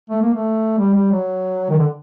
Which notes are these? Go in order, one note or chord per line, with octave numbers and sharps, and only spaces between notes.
A3
A#3
A3
G3
G3
F#3
D#3
D3